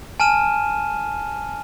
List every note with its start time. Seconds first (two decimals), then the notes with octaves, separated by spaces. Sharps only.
0.20 G#5 A5 F6 D#7 E7